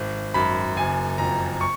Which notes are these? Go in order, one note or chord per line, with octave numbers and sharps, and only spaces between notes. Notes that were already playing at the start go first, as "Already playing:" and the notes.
Already playing: G#1
F#2 B5
F#1 G#5
F2 A#5
C#6